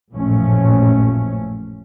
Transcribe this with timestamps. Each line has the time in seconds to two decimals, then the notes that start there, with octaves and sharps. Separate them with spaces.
0.13 A1 F#2 A#2 F3 A3 C#4